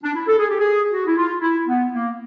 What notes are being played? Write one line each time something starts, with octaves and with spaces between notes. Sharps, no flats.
D4
E4
A4
G#4
G4
G#4
F#4
E4
F4
E4
B3
A#3